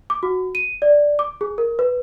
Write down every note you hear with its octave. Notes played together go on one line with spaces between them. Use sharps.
D6
F#4
D#7
D5
D6
G#4
A#4
B4